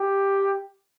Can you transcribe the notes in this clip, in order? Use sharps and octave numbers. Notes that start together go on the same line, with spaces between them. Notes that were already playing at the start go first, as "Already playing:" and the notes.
Already playing: G4